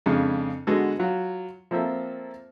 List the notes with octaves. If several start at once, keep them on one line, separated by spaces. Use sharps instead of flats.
F2 C#3 G#3 D4
D3 G#3 B3 F#4 A4
F#3 F4 F#5
F3 A#3 C4 A4 E5